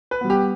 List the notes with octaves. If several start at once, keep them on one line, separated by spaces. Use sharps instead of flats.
B4
G3 B3
G4